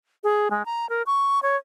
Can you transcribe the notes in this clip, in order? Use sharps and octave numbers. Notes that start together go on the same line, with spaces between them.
G#4
G#3
A#5
A#4
C#6
C#5